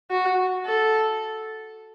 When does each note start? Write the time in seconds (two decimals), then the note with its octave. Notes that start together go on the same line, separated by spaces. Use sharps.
0.11 F#4
0.65 A4